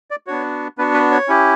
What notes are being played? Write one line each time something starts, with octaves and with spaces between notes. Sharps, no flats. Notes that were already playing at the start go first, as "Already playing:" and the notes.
D5
B3 D4 F#4 C#5
B3 D4 F#4 B4
B4
C#5
C#4 E4 G4